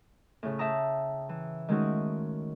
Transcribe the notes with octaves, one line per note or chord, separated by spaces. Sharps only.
A2 C#3
E5 G5 A5 A#5 D#6
E3
D#3 G#3 A3 C#4 D#4 F#4